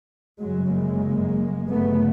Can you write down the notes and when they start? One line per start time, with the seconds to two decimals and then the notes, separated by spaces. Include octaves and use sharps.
0.40 G1 F#2 C#3 F#3 G#3
0.72 G#3 A#3
1.68 G1 F#2 C#3 A3 B3